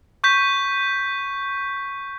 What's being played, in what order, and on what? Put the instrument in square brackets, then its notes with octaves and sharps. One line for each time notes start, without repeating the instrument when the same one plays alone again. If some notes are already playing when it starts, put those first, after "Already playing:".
[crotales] C#6 G6 B6